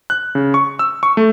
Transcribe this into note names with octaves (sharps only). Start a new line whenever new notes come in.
F#6
C#3
C#6
E6
C#6
A3